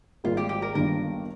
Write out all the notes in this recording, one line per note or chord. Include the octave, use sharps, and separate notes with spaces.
G#1 G#2 G3 A#3 F4
G4
G4
A#4
G1 G2 D#3 A#3 D4 A#4